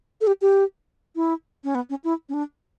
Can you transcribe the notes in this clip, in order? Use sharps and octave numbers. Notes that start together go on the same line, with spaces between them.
A4
G4
G4
E4
C#4
B3
C#4
E4
C#4
D4